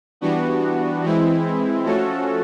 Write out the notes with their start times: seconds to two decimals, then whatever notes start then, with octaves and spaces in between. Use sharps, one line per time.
0.21 E3 G3 B3 D4 F#4
1.03 E3 G#3 C4 E4
1.85 F3 A3 C#4 F#4 A4